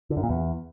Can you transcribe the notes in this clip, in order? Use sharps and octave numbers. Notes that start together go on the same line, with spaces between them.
D3
F#2
A#2
E2